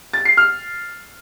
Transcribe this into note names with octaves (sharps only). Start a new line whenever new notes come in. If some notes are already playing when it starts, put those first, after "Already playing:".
A6
C7
F6